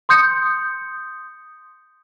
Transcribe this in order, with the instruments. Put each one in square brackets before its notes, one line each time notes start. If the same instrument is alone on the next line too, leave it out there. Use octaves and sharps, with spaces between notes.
[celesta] C6 D#6 G6 C#7